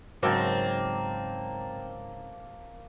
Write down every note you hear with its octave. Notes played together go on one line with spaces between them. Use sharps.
G#2 C#3 F#3 A#3 C4 A5 A#5